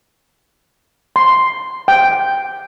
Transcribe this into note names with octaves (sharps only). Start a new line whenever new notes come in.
C6
G5